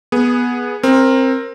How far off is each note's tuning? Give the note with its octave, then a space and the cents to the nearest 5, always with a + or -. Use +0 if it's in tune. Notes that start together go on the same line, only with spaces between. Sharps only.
B3 -10 G#4 +0
C4 +15 A#4 +0